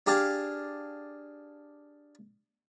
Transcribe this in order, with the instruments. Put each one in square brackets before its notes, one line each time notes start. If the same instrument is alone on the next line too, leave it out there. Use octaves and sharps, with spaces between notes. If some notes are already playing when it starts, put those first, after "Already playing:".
[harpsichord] D4 G4 G#4 F5 A5